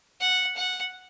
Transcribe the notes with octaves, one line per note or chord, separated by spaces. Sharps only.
F#5
F#5